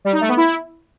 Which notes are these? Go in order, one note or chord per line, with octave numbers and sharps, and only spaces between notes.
G3
D#4
A3
B3
E4